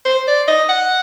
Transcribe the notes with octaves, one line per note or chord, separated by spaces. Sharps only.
C5
D5
D#5
F#5